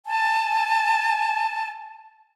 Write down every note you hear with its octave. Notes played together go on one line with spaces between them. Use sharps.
G#5 A5